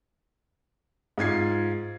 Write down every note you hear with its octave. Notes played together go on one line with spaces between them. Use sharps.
G#2 F4 G#6 C7